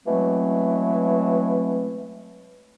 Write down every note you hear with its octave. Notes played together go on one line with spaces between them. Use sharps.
B2 E3 F#3 G#3 A3 C4